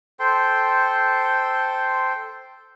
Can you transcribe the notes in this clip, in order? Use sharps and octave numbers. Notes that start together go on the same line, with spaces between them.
A4 C5 G5 C6